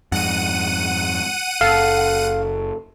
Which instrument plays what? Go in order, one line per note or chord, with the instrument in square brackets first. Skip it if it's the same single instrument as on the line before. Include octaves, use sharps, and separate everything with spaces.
[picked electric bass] F2 G#2 [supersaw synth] F#5 D#7
[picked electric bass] F#1 [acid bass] A4 [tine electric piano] F5